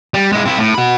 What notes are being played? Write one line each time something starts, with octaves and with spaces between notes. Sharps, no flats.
G3
G#3 E4
C4 E4
A2
F#4 B5